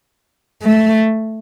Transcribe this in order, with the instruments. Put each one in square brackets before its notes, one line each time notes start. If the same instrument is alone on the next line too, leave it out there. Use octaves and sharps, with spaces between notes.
[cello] A3